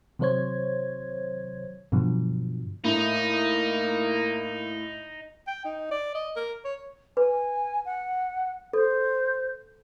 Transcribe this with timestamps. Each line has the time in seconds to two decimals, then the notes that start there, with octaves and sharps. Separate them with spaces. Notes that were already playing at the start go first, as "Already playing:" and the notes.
0.19 C3 D#3 F#3 C5 C#5 G#6
1.92 G2 B2 D3 F3 F#3
2.85 A2 A#3 D#4
5.47 G5
5.65 D#4
5.91 D5
6.15 D#5
6.36 A#4
6.65 C#5
7.17 B4 G#5
7.85 F#5
8.73 A4 C5